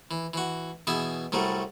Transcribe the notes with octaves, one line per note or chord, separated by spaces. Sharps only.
E3
E3 F#4
B2 E3 G#4 E5
C2 F#3 G3 A3